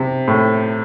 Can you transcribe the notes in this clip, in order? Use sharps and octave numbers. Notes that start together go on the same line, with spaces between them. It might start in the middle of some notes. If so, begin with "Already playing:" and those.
Already playing: C3
A2